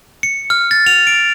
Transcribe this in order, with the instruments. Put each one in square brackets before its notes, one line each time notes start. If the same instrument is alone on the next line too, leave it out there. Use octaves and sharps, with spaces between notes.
[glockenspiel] C#7
F6
A6
F7
D7